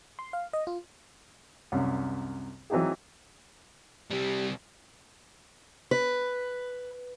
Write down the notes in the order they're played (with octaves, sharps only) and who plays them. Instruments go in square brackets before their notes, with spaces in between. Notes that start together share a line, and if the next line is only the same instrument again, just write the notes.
[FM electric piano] C6
F5
D#5
F4
[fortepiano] C2 F#2
E3 F#3 C4 D#4 G4 G#4
[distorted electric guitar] C3 G3 [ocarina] G4
[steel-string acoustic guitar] B4